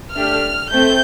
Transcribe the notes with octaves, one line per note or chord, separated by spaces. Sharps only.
A3 D4 G4 F6
A3 C4 G6